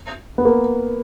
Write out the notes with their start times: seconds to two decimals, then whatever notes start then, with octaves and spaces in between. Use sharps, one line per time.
0.38 B3
0.45 A#3